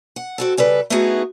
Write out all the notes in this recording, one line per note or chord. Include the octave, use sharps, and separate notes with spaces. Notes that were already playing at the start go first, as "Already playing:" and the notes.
F#5
C4 F#4 A4
C#3 G3 A4 B4
A3 B3 D#4 E4 F#4 G#4